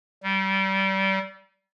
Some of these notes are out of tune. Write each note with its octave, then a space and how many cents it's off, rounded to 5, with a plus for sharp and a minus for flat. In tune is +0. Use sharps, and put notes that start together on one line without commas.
G3 -25